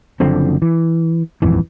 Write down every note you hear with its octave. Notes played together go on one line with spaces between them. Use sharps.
F#1 D3 F3 C4
E3
D#1 G#1 F2 E3